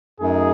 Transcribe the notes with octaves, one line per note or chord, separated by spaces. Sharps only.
F#2 F#3 A3 D#4 G#4